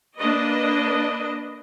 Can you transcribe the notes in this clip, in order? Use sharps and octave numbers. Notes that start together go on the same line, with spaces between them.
A#3 D4 B4 D#5